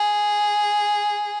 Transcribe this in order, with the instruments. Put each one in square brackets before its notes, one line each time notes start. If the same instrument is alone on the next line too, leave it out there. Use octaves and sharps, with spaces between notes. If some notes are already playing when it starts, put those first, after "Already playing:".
Already playing: [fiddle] G#4